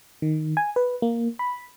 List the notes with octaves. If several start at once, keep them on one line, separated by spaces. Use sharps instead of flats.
D#3
G#5
B4
A#3
B5